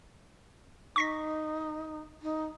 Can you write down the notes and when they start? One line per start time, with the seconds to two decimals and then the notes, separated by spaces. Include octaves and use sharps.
0.96 D#4 C#6 A#6 B6
2.22 D#4